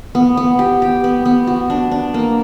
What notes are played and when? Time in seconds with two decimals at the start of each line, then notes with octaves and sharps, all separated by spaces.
0.15 B3
0.37 B3
0.59 G4
0.82 G4
1.04 B3
1.26 B3
1.47 F#4
1.70 D4
1.92 D4
2.14 A#3